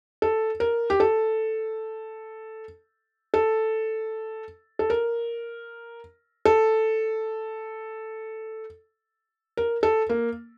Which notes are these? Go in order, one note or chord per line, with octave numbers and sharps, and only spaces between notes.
A4
A#4
G4
A4
A4
A4
A#4
A4
A#4
A4
A#3